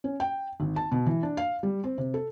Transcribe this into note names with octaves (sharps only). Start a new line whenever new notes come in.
C#4
G5
G#1
A5
B2
E3
D4
F5
G3
C4
C3
A4